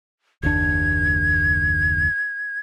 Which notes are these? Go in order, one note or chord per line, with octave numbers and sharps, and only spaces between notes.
F#1 D#2 D4 G#6